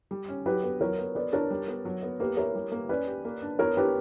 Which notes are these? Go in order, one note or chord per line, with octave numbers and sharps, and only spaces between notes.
G3
C#4
F#3 G4 B4
B3
F#3 A#4 C#5
B3
B3 B4 D5
D4 A#4 C#5
G3
B3
F#3
B3
A#3 G4 B4
E4 A#4 C#5
G3
A#3
C#4 B4 D5
G4
A#3
D4
B3 A#4 C#5
D4 G4 B4